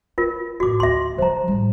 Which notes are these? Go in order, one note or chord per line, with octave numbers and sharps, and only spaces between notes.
D#4 F4 A#4
A2 E4 F#4 D6
D2 E5 C6
C#3 F3 C5 A#5
A2 G3